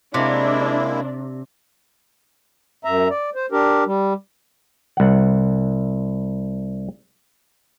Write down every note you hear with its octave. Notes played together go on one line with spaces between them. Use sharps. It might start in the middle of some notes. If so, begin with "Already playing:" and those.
C3 G#3 A#3 D4 E4
F#2 E5 A#5
D5
C5
D4 G4 A#4
G3
C2 F#5